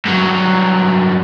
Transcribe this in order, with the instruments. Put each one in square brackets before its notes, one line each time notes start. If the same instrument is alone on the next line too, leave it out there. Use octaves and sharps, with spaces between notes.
[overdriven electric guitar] G2 F#3